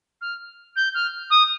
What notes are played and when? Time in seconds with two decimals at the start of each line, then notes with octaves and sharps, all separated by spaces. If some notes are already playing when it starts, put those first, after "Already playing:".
0.21 F6
0.76 G6
0.94 F6
1.30 D#6